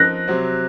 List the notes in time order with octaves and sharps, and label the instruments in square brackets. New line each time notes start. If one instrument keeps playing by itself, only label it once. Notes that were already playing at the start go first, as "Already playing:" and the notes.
Already playing: [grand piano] F3 C4 D#4 A#4 [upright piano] F#6 A#6
[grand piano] C3 F#3 C4